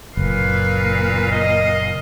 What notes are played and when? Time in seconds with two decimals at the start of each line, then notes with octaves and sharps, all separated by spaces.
0.17 F#1 A#2 B4 F5
1.32 D#5